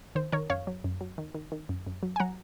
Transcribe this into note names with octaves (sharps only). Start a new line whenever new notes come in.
D#3 C5
D#3 A#4 C#5
F#2 C#5 F5
F#3
F#2
F#3
D#3
D#3
D#3
F#2
F#2
F#3
G#5
F#3 F#5 A#5